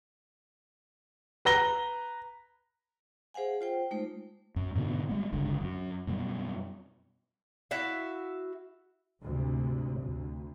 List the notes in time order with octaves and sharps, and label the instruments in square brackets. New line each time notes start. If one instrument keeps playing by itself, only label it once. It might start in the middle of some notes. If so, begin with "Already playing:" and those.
[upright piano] B4 A#5 A#6 G7
[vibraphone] G#4 C5 F5 F#5 G#5
F4 C5 G5
G#3 A3 D#4 C5
[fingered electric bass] F#2
G#2 B2 D3 B3
G3 G#3 B3
G1 C#2 D3
F#2
F#2 B2 G3
[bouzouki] E4 F#4 E5 F5
[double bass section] D2 G#2 C3
D2